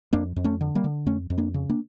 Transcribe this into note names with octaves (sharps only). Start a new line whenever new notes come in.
F2 A#3 D4
F2
A3 C#4
D3
G3 A#3
D3
F2 A3 C#4
F2
A#3 D4
C#3
A#3 D4